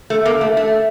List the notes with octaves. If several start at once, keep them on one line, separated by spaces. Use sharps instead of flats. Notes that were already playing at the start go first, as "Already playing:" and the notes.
A3
A#3
A3
A3